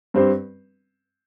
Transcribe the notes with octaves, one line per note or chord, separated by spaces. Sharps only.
G2 G3 C4 G4 C5